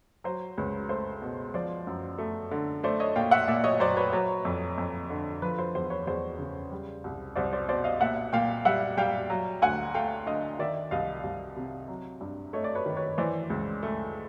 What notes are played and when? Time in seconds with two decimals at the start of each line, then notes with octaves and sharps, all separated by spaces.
0.24 F#3 C5
0.58 C#2 B4 C#5
0.89 A3 C5
1.22 B2
1.54 F3 C5 D5
1.87 F#2
2.18 A3
2.51 D3
2.84 A3 C5 D5
3.00 C#5 D#5
3.16 A#2 F5 G5
3.31 E5 F#5
3.48 A#2 D5 E5
3.64 C#5 D#5
3.80 F#3 C5 D5
3.97 B4 C#5
4.13 F#3 B4 C#5
4.45 F2
4.78 F2
5.10 D3
5.42 F3 B4
5.58 C5
5.75 E2 C5
5.90 B4 C#5
6.07 E2 C5 D5
6.39 C#3
6.71 G3
7.04 C2
7.36 C2 C5 D5
7.53 C5 D5
7.69 B2 C5 D5
7.84 D#5 F5
8.01 A#2 E5 F#5
8.33 A#2 F5 G5
8.65 G3 E5 F#5
8.97 G3 F5 G5
9.30 F#3
9.62 D2 F#5 G#5
9.94 A3 F5 G5
10.27 D3 D#5 F5
10.59 D#3 D5 E5
10.91 C2 D#5 F5
11.23 C2
11.57 C3
11.88 F#3
12.21 G2
12.53 A3 C#5 D#5
12.64 D5
12.75 B4 C#5
12.86 D#3
12.96 B4 C#5
13.18 E3 C5 D5
13.50 C#2
13.83 A3